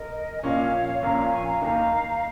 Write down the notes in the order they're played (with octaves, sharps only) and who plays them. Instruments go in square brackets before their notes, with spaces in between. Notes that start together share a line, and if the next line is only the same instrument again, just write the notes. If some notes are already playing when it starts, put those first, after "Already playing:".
Already playing: [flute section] A#4 D#5
G#5
[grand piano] A#1 A#2 A#3 C#4 [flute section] C#5 F5
[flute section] C#6
[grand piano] A#1 A#2 A#3 C#4 [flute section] F5 A#5
[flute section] F5 A#5
G#5 C#6
F5 A#5
[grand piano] D#2 D#3 A#3 [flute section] F5 A#5